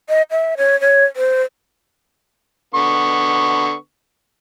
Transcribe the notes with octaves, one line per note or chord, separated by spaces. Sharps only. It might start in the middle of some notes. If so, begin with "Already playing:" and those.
D#5
E5
C#5
C#5
C5
D3 B3 C#6